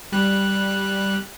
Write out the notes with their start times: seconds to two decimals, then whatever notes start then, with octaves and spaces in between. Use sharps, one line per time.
0.12 G3 F#6